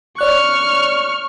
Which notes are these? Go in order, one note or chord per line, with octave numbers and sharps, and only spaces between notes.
C#5 D5 C#6 F6 F#6